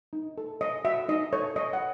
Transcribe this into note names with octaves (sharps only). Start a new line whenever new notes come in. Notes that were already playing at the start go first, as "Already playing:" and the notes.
D#4
A4
C#5 D#5
F#4 E5
D#4 D#5
A4 C#5
C#5 D#5
F#5